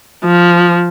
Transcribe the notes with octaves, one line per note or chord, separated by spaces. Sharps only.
F3